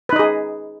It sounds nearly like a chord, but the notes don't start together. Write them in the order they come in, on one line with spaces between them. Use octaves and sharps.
B4 D#4 D#5 G#4